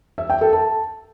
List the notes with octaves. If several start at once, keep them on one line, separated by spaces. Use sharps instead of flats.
E5
G5
A4
A5